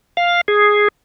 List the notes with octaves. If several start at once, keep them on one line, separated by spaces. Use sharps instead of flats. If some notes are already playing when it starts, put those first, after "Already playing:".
F5
G#4